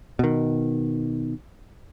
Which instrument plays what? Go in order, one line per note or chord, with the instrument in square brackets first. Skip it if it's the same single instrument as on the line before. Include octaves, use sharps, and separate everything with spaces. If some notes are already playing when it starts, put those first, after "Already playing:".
[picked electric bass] B2 D#3